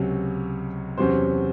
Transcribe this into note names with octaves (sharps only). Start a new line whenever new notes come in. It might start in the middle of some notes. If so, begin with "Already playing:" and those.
Already playing: C#2 C3 F#3 C#4
E2 C3 F#3 C#4 C5